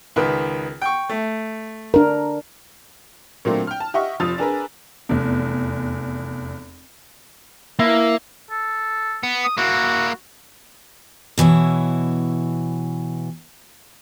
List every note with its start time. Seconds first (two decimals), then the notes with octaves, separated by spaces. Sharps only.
0.16 C#2 D#3 B4
0.82 G5 C#6
1.09 A3
1.94 D4 A#4
3.45 A#2 D3 F#3 A3 A#3 C4
3.67 G5 F6
3.80 A5
3.94 G4 D#5 E5 F#5 C#6
4.20 F1 F3 D#6 E6 A6 F7
4.38 D4 G#4 A#4 B4
5.09 F1 E2
7.79 A#3 E4
8.51 A4
9.23 B3
9.44 D#6
9.57 A#3 E4 F#4
11.38 B2 E3 E4 C#5